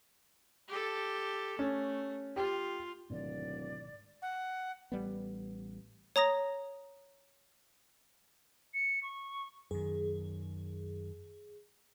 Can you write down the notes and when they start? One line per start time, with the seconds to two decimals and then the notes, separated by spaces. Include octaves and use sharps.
0.68 G4 A4
1.59 A3 C#4
2.36 F4 G4
3.10 D1 G#2 B2 D#3 D5
4.22 F#5
4.92 A1 G3 B3
6.16 C#5 A#5 D#6 A#6
8.74 C#7
9.03 C#6
9.71 F#2 D#3 G#4